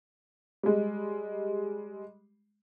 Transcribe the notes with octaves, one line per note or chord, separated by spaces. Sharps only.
G3 G#3